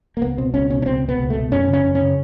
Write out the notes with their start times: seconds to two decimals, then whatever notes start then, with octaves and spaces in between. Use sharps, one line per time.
0.17 A#3
0.21 C#2 B3
0.38 B2 C4
0.54 C#2 C#4
0.70 B2 C#4
0.82 C#4
0.86 C#2 C4
1.03 B2
1.09 B3
1.19 C#2
1.30 B2 A3
1.52 F#2 C#4
1.68 C#3
1.73 C#4
1.84 F#2
1.95 C#4
2.01 C#3